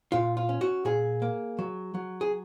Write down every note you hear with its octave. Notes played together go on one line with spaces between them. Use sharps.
A#2 F4
F4
C#4
F#4
A#2 G#4
A#3
F#3
F#3
G#4